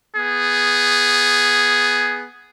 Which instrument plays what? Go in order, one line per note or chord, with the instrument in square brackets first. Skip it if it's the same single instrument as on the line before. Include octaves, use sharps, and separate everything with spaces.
[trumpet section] B3 G#4